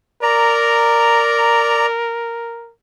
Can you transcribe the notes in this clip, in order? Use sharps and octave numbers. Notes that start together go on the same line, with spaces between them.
A#4 D5 A#5